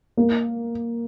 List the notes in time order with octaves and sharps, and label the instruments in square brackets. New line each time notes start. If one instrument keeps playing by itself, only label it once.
[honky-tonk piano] A#3